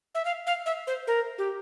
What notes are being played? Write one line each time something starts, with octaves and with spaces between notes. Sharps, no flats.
E5
F5
F5
E5
C5
A#4
G4